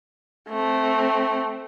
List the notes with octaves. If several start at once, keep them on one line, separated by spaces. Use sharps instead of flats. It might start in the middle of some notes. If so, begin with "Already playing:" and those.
A3 C4